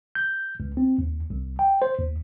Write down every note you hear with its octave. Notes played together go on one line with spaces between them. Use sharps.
G6
C#2
C4
D#2
C2
G5
C5
D#2